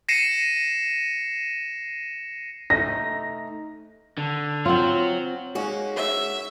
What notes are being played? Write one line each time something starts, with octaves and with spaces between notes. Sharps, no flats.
A#6 C7 C#7 D#7 E7
A3 D#4 A#6
D3
C4 F4 C#5 F#5
G#3 A#3 C#4 D#4 F#4
E5